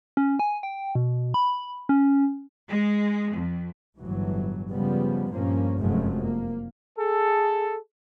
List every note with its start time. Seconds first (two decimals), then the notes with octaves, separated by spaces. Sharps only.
0.17 C#4
0.39 G#5
0.63 G5
0.95 B2
1.34 B5
1.89 C#4
2.69 G#3
3.33 F2
3.99 G1 A2 E3 F#3
4.73 C#3 F3 G3 G#3 B3
5.31 G2 A#2 F3 A#3 C#4
5.80 F1 F#2 F3 F#3 G#3 A3
6.24 A#3
6.98 G#4 A4